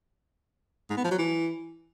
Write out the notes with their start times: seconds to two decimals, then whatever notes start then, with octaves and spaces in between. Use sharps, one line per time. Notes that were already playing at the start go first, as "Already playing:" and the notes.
0.90 G#2
0.97 B3
1.04 F3
1.11 F#3
1.18 E3